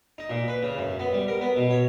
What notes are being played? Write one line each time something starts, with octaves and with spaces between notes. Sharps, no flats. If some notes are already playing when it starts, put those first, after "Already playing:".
D#4
A#2
B4
C#3
F#2
B3
G3
A#4
B3
B2
C#5